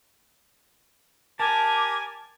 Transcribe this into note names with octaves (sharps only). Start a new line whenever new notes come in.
G4 A#4 G#5 A5 D6